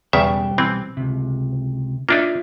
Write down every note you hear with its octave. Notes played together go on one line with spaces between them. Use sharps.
B1 E2 C#3 G3 E5 G5
E3 C4
C#2 C3
A#3 D4 D#4 F4 E5